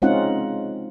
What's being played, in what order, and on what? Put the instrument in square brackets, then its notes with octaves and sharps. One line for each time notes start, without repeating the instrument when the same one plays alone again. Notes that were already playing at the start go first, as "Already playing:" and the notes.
[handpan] G#3 C4 C#4 D#4 F4 F#5